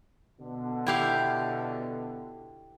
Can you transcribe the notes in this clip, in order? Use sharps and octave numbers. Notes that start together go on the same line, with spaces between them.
B2 D3
E4 G4 F5